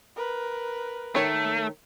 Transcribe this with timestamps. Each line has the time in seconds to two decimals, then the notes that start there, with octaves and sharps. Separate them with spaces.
0.16 A#4 B4
1.15 D#3 A3 C#5